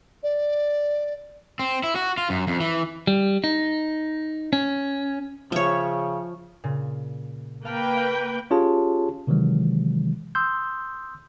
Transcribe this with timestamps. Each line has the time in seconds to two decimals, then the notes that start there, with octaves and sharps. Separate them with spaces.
0.23 D5
1.59 C4
1.83 E4
1.96 F#4
2.18 F4
2.30 F#2
2.47 F2
2.60 E3
3.07 G3
3.44 D#4
4.53 C#4
5.52 C#3 F3 C#5 E5
6.64 A#2 C#3
7.65 A#3 B4 F5 G5 A5 F6
7.97 F5
8.51 C#4 F4 G4 G#4 C#5 A5
9.27 C3 D#3 E3 F#3 G#3
10.35 C6 D#6 E6 G6